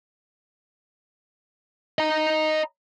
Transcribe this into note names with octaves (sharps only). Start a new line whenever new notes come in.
D#5 A#5